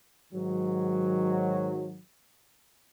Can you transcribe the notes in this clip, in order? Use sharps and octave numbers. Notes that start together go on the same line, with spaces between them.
G#2 D#3 F#3